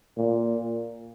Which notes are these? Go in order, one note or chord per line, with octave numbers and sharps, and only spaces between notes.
A#2